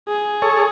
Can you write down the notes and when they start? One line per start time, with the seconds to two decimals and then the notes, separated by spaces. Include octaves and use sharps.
0.09 G#4
0.42 A4 C#5